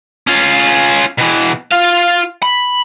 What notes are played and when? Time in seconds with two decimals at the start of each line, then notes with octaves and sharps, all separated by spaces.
0.27 C#4 F4
1.18 B2 E3
1.71 F4 F5
2.43 B5